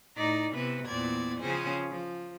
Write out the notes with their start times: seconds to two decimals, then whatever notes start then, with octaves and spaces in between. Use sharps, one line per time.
0.16 A2 D#4 D5 A#5
0.52 C3 E3 B3 B4
0.87 E2 A#2 B3 C4 D5 G#6
1.39 C#3 F3 C4 C#4 G#4 C5
1.90 F3